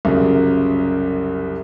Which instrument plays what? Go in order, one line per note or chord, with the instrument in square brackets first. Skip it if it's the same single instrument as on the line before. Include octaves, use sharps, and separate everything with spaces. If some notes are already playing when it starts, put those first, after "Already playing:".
[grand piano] C2 F#2 C#3